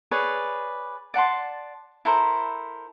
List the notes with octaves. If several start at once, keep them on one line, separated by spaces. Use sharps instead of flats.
G#4 B4 C#5 D5
D5 F#5 A5 C6
E4 A4 A#4 C5